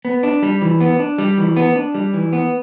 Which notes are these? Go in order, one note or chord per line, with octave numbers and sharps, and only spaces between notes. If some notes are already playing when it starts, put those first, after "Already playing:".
B3
D4
G3
E3
B3
D4
G3
E3
B3
D4
G3
E3
B3